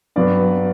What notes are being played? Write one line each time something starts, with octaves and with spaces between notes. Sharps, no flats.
G2 F#3 B3 D5